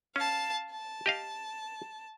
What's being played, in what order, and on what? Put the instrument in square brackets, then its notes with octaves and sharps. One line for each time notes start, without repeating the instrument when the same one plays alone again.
[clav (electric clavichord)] C#4 [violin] F5 A5
[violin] A5
[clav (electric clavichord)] G4 D#5 F5